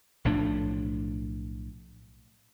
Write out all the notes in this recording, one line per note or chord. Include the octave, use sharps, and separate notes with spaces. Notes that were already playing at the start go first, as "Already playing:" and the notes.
B1 A2 F3 D4